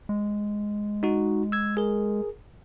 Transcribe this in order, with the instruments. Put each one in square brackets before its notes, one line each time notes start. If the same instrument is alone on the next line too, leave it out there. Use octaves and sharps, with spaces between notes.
[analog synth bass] G#3
[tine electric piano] D#4 F#4
E6 G#6
G#4 A#4